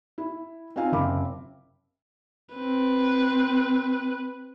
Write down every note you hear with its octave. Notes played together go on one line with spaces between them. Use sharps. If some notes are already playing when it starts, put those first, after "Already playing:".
E4
C4 D#4 F4 F5 G#5
F#1 C3 C4 F5 B5 D6
C4 B4